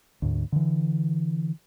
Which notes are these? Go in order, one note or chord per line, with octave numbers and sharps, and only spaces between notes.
D2 G#2
D3 E3